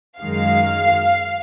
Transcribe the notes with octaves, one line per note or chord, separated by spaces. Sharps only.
F#2 D#3 G#3 F5